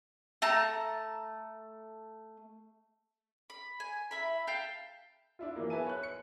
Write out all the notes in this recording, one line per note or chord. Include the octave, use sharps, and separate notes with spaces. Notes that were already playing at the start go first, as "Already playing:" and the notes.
A3 A5 A#5
B5
G#5
E4 E5 B5
F5 G5 A5 G6
D4 E4 F4
E3 F#3 A#3 D#4
B3 B4 E5 G#5 A5 D#7
C#5 F#6
C#7